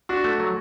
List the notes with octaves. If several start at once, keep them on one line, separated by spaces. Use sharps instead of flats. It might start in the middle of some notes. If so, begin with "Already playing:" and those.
D4 F#4
A3
F#3